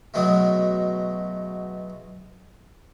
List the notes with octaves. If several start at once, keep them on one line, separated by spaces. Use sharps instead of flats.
B2 F#3 G#3 A3